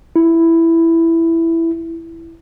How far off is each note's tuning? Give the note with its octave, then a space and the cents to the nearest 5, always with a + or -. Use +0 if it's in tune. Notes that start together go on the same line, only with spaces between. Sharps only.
E4 +5